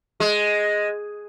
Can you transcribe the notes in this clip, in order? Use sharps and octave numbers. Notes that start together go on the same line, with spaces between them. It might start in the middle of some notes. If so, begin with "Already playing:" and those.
G#3